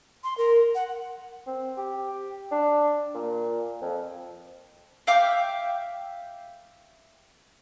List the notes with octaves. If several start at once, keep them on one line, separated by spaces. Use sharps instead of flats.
C6
A#4
F#5
C4
G4
D4
A#2
F2
E5 F5 G5 D6